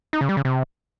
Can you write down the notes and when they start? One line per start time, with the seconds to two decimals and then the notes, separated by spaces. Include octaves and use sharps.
0.13 D#4
0.21 C#3
0.29 G3
0.37 C#3
0.45 C3